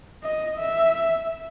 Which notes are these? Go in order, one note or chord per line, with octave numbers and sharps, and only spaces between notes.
D#5
E5